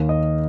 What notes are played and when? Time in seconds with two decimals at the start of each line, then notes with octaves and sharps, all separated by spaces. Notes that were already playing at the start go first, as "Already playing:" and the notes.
Already playing: D#2 D#3 A#3
0.09 D#5